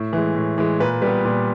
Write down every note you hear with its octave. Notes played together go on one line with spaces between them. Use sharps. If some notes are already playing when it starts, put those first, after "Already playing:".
Already playing: A2
E3 G#3
A2
E3 G#3
A#2 B4
G3 B3 B4
A#2